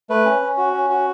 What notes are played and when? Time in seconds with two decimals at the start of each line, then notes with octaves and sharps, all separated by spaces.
0.10 A3 B4
0.26 C#4
0.42 C#4
0.57 F#4
0.73 C#4
0.90 F#4